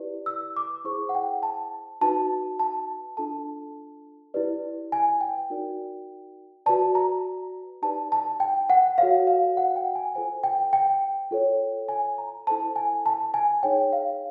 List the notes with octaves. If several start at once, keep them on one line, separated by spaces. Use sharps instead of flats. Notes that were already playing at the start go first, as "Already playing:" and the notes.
Already playing: E4 G4 B4 D5
E6
D6
E4 G#4 C5 C#6
F#5
G5
A5
D#4 F#4 B4 A5
A5
D4 F4 A4 A5
E4 G4 B4 D5
G#5
G5
D#4 F#4 A#4 D5
F#4 B4 D5 A5
A#5
D#4 G4 B4 D5 A5
A5
G5
F#5
F#4 A4 C#5 F5
F5
F#5
G5
G#5
F4 A4 C5 G#5
G5
G5
F4 A4 C#5
G#5
A#5
E4 A4 C5 A5
G#5
A5
G#5
D#4 G#4 C#5 G5
F5